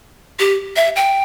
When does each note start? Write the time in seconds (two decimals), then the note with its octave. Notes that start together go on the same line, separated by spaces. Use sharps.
0.39 G4
0.76 E5
0.96 G5